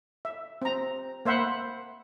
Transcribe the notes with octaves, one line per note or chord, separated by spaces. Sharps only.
E5
C4 A#5
A#3 C5 E5 F#5 B5